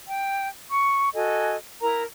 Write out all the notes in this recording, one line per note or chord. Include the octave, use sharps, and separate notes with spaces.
G5
C#6
F#4 A4 D#5 G#5
E4 A#4 A#5